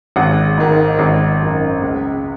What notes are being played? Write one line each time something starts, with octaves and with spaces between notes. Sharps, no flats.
G#1 F#5
G#2 D#3
G#1
F#2 D#3
C#2